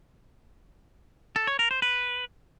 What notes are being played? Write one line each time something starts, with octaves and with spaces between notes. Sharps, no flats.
A4
C#5
A#4
C5
B4